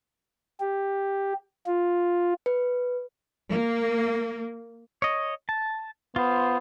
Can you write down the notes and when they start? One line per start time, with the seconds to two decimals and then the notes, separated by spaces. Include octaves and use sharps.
0.60 G4
1.66 F4
2.46 B4
3.50 A#3
5.02 C#5 D#5
5.49 A5
6.16 B3 F4 C5